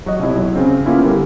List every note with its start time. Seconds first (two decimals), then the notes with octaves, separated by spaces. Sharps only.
0.06 F#3 F#4 D#5
0.19 B1 C3 E4
0.38 F#3
0.56 C#3 C4
0.85 A#3 B3 C#4 E4 F4
1.04 D3 G3 A#4